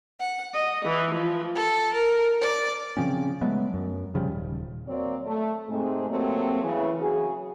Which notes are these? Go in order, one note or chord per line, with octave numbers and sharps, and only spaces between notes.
F#5
D#5
E3
F3
A4
A#4
D5
C#3 F3 C4 C#4
F#3 G#3 A3 B3
F#2
G#1 C#3 F3 G3
D#1
F#3 A#3 C4 C#5 D5
A3
G#2 C3 G#3 A3 C4
C3 F#3 A3 A#3 C4
C#3 E3
C#3 F#3 F#4 G#4